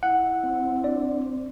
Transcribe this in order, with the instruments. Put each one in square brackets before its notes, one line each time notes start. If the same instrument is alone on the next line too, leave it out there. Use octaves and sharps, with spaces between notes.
[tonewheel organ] E4 [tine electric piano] F#5
[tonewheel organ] C4
[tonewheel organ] D4 [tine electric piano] D5